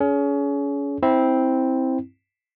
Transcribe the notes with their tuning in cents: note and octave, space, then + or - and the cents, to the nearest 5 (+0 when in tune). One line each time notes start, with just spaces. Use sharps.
C#4 +30 G#4 +30
C4 +0 E4 -20